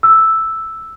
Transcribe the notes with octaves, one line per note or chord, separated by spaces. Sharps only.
E6